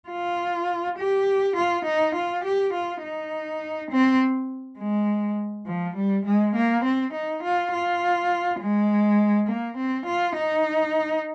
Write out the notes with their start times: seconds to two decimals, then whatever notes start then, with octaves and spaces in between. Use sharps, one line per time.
0.09 F4
0.98 G4
1.56 F4
1.85 D#4
2.15 F4
2.45 G4
2.73 F4
3.03 D#4
3.91 C4
4.78 G#3
5.66 F3
5.96 G3
6.25 G#3
6.55 A#3
6.84 C4
7.13 D#4
7.43 F4
7.73 F4
8.60 G#3
9.48 A#3
9.77 C4
10.06 F4
10.37 D#4